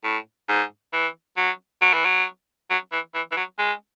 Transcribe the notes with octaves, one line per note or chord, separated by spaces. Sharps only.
A2
G#2
E3
F#3
F#3
E3
F#3
F#3
E3
E3
E3
F#3
G#3